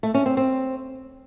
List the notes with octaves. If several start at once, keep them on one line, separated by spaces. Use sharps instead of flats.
A3
C#4
C4
C4